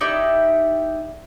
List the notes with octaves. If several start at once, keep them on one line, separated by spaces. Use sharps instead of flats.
D#4 E4 G4 D5